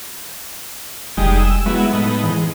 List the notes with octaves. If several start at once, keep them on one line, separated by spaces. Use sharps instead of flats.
F1 G3 G#3 D#4
E6
F#3 G#3 B3 E4
A2 B3 D#4
G#2 E3